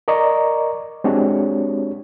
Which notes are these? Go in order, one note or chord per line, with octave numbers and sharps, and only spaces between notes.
A#4 D5 D#5 A#5 C#6 D6
G#3 C4 D4 F#4 G4 C#5